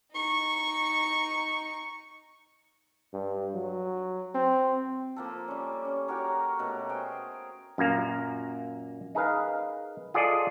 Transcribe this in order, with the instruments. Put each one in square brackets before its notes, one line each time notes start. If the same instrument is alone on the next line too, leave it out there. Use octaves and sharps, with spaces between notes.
[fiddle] D#4 C#6
[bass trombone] G2
F#3
C4
[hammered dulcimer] F3 A#3 A4
G3 C#4
C#4
F#4 G4 A#4 C#5
B2 A3 A#4
G#4 C5 G5
[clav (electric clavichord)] F#2 A#2 A#3 F5 A#5
D#4 G#4 A#4 B4 F5
F4 G#4 A4 D5 D#5